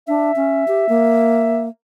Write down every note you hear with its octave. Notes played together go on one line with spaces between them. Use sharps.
D4 E5
C#4
G4
A#3